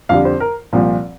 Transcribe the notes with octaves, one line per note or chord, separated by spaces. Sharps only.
F2 D3 G3 F5
C5
A#4
C2 A#2 F3 C4